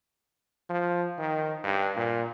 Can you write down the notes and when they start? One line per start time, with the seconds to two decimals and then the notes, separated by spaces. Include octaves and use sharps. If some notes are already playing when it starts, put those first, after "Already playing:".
0.70 F3
1.18 D#3
1.64 G2
1.96 A#2